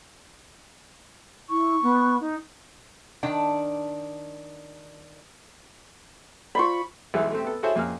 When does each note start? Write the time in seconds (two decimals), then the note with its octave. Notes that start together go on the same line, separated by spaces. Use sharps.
1.49 E4 C#6
1.82 B3
2.21 D#4
3.23 D#3 D4 G5
6.55 F4 C5 D5 B5 C#6
7.14 B1 E3 G#3 E4 G#4
7.32 A3 C4 G4
7.45 B3 A4
7.63 E4 F#4 G#4 A4 C5 C#5
7.75 F2 A#3 C#4 G#4 F6